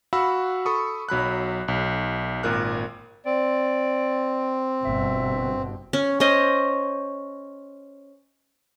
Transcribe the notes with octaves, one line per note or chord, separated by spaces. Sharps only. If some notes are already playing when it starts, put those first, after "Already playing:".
F#4 F5 F#5 B5 E6
A4 B5 C#6 D#6
B1 F#3 B5 F#6
B1
G#1 A#2 A#4 F#6
C4 D5
G1 G2 B2 E5
C#4
C#4 C5 D#5